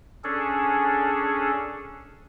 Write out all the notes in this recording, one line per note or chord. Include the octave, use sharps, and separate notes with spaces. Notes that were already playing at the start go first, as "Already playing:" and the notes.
C#4 D4 G#4 A4